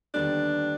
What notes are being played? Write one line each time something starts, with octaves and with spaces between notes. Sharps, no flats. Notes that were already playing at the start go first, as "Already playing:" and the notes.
D#2 D3 G3 B3 D4